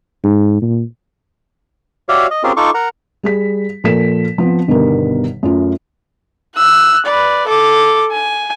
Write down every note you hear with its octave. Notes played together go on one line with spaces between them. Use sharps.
G#2
A#2
F#4 G4 C#5 D5 E5 F5
D#5
C4 C#4 F4 G4 G#4 A#4
D#4 F4 A4 C#6 D6
A#4 F#5 A#5
G3 G#4 B6
A#2 F3 A4 A#4 B6 E7
F3 B3 C4
G1 B2 D3 D#3 G3 A#4
F#2 A3 F4
E6 F#6
B4 D5
A4 D6
G#5